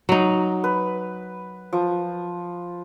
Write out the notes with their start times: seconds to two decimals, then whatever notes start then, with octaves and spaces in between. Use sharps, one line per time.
0.09 F#3 D#4
0.64 B4
1.73 F3